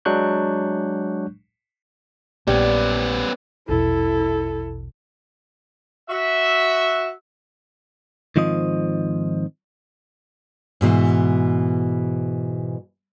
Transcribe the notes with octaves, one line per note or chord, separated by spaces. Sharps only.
F#3 G#3 D4 C#6 F#6 G6
A#1 G3 B3 C#4
A#1 E2 B2 E4 A4
F#4 E5
G#2 D#3 F3 C4 D#5
G#2 B2 D#3 E3